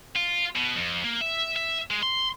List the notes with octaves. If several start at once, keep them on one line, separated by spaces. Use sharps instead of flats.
F4
B2
F2
A#3
E5
E5
G#3
C6